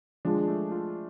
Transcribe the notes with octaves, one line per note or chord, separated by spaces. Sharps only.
F3 G#3 D4
A3
F4